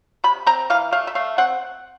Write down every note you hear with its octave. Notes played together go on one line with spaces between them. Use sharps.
C3 B5
C4 A#5
E3 F5
A3 F5
E5
A3 F5
C4 F#5